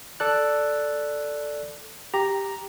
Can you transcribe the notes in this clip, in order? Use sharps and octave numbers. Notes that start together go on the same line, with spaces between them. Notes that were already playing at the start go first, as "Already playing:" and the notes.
A4 D5 F#6
G4 A#5